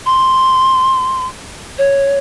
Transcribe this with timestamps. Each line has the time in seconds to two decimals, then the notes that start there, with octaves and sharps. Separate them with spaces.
0.06 C6
1.79 C#5